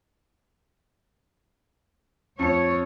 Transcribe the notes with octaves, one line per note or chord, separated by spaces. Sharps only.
F2 C#5